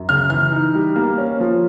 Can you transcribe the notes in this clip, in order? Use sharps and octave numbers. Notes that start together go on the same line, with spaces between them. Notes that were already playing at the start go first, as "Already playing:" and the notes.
Already playing: F#2
C#3 F6
E3 F6
D#4
G3
A#3
C#4
F3